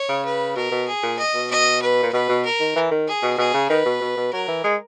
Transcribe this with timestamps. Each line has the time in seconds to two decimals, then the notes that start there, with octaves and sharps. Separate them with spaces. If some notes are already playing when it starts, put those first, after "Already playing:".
Already playing: C#5
0.09 C#3
0.25 B4
0.56 B2 A#4
0.72 B2
0.88 G#4
1.03 A#2
1.19 D#5
1.34 B2
1.51 D#5
1.82 B4
2.03 A#2
2.13 B2 B4
2.29 B2
2.45 A#4
2.60 D#3
2.76 E3
2.91 D#3
3.08 G#4
3.23 B2
3.38 B2 G#4
3.54 C#3
3.69 D#3 B4
3.86 B2
4.01 B2
4.17 B2
4.33 F#3 A#4
4.48 E3
4.64 G#3